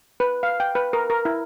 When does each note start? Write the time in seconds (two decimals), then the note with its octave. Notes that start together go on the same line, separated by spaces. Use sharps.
0.20 B4
0.43 F5
0.60 G5
0.75 B4
0.93 A#4
1.10 A#4
1.25 E4